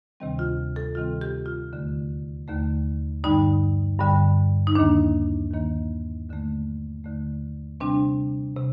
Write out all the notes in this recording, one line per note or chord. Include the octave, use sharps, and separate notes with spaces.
D2 C3 D#3 G3 C4
F4
A4
D2 C3 D#3 G3 C4 F4
G4
F4
D#2 D3 A3
D#2 D3 A3
G2 D3 G3 D#4
G2 D3 G3
D#4
D#2 D#3 A#3 D4
D#2 D#3 A#3
D#2 D3 A3
D#2 D3 A3
C3 G3 C4 D4
C3